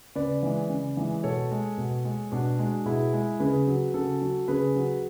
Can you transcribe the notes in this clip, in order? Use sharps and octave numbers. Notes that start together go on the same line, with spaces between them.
C#3 B4 D5
E3 G#3
C#3
E3 G#3
B2 A4 C#5
G#3
B2
G#3
B2 D4 F#4
G#3
B2 E4 G#4
G#3
C#3 G#4 B4
F#3
C#3 F#4 A4
F#3
C#3 G#4 B4
F#3